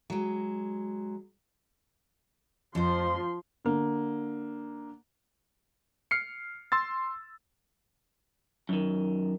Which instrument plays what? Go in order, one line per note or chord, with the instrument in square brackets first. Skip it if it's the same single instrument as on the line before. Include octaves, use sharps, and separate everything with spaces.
[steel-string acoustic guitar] F#3 G#3
[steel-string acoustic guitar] F2 C5 [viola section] F3 C6
[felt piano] D3 A#3
[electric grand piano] F6 C7 C#7
C6 E6 A6
[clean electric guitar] F#2 D#3